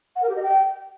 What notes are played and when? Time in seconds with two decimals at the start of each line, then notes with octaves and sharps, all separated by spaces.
0.16 F#5
0.23 A#4
0.29 G4
0.36 D#5
0.43 G5